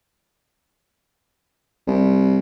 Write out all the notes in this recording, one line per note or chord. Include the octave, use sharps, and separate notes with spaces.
C2